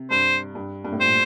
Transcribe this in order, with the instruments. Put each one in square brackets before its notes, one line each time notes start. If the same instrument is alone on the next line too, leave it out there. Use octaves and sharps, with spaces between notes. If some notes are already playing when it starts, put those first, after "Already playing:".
Already playing: [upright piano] C3
[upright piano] G2 [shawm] C5
[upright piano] G2
G2
A2
[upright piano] A#2 [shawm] C5